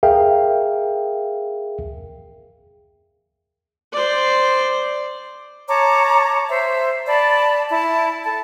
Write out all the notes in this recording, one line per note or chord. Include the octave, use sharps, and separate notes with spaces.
G#4 A#4 E5 F5 G5
C5 D5
C#5 A5 A#5 D6
C5 E5
D5 A5 B5
E4 A5
A4 A5